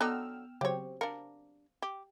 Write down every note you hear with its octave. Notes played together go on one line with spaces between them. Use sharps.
D3 F#3 B3 D#4 G5 E6 F6
C#3 F#3 C4 G4 C#5
D4 A#4 F5
G4